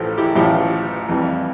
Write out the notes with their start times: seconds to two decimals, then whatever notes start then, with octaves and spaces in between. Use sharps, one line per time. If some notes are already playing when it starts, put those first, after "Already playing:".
Already playing: A1 A2 F3 G4 A4 B4 C5
0.18 E4 G4
0.35 A1 A2 F3 E4 G4
1.08 F2 E3 G3